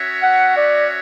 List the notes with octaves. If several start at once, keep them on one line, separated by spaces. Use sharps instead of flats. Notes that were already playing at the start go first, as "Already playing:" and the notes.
Already playing: C#4 F#4 C#5 E5
F#5
D5